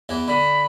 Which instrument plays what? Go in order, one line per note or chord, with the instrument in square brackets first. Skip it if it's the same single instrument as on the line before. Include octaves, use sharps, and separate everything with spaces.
[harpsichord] E2 E3
[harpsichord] D3 [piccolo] B5